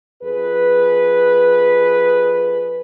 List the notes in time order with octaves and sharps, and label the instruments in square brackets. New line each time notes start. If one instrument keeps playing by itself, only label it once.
[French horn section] F2 G#4 B4